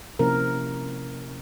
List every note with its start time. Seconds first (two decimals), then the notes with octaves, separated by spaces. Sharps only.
0.19 C3 F3 A#3 C#4 E4 A#4